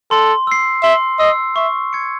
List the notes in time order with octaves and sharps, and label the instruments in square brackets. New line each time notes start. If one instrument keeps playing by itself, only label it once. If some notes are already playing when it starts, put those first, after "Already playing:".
[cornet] A4 [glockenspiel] C6
[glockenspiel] E6 C7
[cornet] E5 [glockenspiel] C6
[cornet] D#5 [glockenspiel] E6 C7
[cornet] E5 [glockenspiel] C#6
[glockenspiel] G#6 C#7